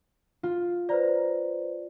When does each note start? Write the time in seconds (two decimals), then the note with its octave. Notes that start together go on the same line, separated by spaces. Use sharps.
0.43 F4
0.89 B4 C5 D5 A#5